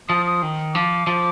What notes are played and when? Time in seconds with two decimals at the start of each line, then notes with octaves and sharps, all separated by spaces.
0.09 F3 D#6
0.26 D#6
0.42 D#3
0.74 F3 D6
1.07 F3